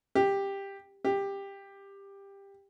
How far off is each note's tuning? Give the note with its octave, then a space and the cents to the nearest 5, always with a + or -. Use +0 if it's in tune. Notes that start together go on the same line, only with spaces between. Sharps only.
G4 +10
G4 +15